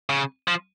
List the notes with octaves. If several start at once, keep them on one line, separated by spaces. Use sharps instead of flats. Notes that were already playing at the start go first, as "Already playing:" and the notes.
C#3
F3